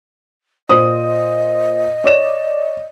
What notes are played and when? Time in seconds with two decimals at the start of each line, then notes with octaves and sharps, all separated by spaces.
0.69 A#2 C5 D#5 D#6
2.04 C#5 D5 E7